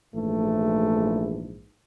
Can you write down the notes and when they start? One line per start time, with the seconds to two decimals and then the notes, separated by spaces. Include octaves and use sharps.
0.13 A#1 G#2 E3 A3